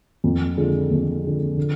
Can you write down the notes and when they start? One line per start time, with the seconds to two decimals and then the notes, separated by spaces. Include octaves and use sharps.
0.24 F2
0.57 D3 F3 G#3
0.91 F2
1.24 D3 F3 G#3
1.57 D3